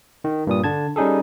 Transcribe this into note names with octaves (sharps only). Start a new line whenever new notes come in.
D#3
G2 A#2 D#6
D3 A5 G#6
G3 C#4 D#4 G#4 A4